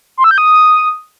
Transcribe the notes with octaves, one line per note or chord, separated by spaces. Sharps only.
C6
E6
G6
D#6